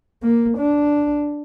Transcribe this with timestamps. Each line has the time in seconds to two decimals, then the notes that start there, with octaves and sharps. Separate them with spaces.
0.23 A#3
0.58 D4